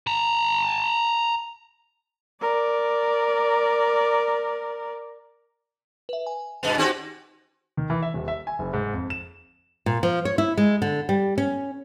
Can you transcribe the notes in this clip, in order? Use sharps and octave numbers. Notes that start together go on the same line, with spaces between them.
A5 A#5
A#4 D5
B4 E5
G#5
G2 B2 B3 F7
C4 D#4 F#4 G4
D#3
E3
E5
D#1
E5
G#5
F#1
G#2
F2
E7
A#2
F3
C#5
E4
G#3
D3
G3
C#4